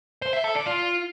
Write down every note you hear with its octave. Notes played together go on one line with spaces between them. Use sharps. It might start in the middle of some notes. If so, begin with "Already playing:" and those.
C5
E5
A4
D5
F4